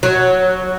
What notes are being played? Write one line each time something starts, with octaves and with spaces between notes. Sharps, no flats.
F#3